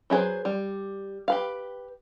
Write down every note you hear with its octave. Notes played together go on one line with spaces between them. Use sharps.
F#3 E4 G#4 B4 C5
G3
G4 B4 F5